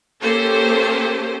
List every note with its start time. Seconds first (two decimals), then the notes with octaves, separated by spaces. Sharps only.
0.20 A#3 C#4 G4 A4 C5